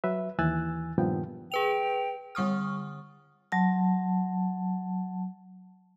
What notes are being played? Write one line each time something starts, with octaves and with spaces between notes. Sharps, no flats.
F#3 B4 E5
D#2 E3 G#5 E6 F#6 A6
G2 A#2 D#3 F3 B3 G5
G#4 B4 G5 F7
D3 G3 C#6 D#6 F6
F#3 A5